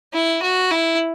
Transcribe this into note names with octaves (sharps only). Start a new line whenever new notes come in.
E4
F#4
E4